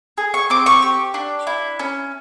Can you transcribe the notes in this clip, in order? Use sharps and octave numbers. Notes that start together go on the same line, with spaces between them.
G#4
C#6
C4 D6
C#6
G4
D4
E4
C#4